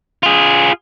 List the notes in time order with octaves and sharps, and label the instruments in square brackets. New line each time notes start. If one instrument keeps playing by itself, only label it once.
[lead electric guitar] F4 G#4